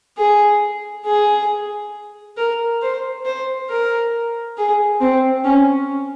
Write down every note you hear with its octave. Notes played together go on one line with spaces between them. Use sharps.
G#4
G#4
A#4
C5
C5
A#4
G#4
C4
C#4